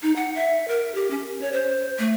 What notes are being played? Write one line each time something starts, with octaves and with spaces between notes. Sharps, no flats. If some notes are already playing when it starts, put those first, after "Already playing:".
D#4
F#5
E5
A#4
G4
C#4
C#5
C5
A3